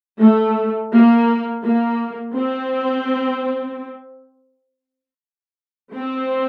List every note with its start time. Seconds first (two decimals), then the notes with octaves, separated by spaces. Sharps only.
0.20 A3
0.92 A#3
1.64 A#3
2.35 C4
5.94 C4